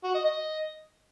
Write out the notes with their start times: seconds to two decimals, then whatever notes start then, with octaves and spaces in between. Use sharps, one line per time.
0.04 F#4
0.14 D#5
0.25 D#5